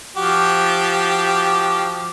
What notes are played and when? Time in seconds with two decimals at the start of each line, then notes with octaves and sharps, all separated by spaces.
0.17 F3 F#4 G4